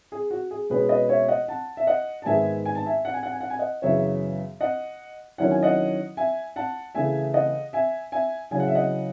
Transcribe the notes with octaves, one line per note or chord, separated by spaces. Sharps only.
G#4
F#4
G#4
B2 G#3 C#4 G#4 B4
B4 D#5
C#5 E5
D#5 F#5
F#5 A5
E5
D#5 F#5
A5
G#2 D#3 G#3 B3 D#4 E5 G#5
G#5
A5
E5 G#5
F#5
G#5
F#5
G#5
F#5
G#5
D#5 F#5
F#2 C#3 E3 B3 C#5 E5
D#5 F#5
D#3 F#3 C#4 E4 F#5
G#5
D#5 F#5
E5 G#5
F#5 A5
C#3 E3 A3 E5 G#5
D#5 F#5
E5 G#5
E5 G#5
C#3 F#3 C#4 E4 G#5
F#5
E5
D#5 F#5